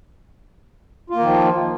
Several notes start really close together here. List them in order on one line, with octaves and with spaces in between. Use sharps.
F4 A#3 D#3 F3